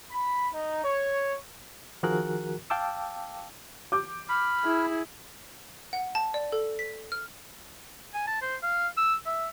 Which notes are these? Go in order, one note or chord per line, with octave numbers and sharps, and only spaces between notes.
B5
D#4
C#5
D#3 F3 F#4 G#4 A#4 F#6
F5 G5 A5 D6 E6
D6 G6
B5 F6
E4 G#4
F#5
A5
D5
A4
B6
F6
G#5
A5
C5
F5
E6
E5